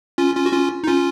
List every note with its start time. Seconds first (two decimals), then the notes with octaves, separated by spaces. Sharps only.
0.18 C#4 F4
0.35 C#4 F4
0.46 F#4
0.52 C#4 F4
0.84 D#4
0.87 C#4 F4